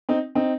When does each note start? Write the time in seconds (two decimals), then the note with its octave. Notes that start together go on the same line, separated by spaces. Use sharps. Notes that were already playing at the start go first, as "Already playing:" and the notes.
0.09 C4 D#4
0.35 C4 D#4